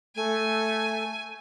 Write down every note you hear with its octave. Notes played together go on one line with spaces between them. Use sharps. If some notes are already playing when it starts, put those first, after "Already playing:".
A3 G#5